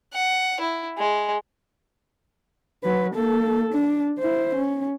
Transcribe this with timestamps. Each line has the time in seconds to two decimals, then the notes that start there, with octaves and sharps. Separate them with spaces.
0.14 F#5
0.61 E4
0.98 G#3
2.84 F#3 B4
3.14 A#3 A4
3.73 D4
4.19 E4 C5
4.55 C#4